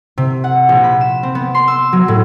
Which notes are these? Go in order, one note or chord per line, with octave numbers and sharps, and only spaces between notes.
C3
F#5
A#1
B5
E7
C4
B3
C6
E6
F#3
A2